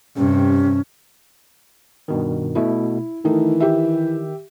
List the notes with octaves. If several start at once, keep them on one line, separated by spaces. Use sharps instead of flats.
G2 C3 C#4
G2 B2 D#3
B2 A3 E4
D#3 E3 A3 D#4
G4 E5